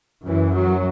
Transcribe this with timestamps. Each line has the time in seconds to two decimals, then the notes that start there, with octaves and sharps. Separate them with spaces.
0.25 F#2 E3
0.54 F#3